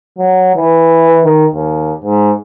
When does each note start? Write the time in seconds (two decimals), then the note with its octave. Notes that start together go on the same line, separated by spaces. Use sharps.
0.18 F#3
0.56 E3
1.24 D#3
1.54 D#2
2.04 G#2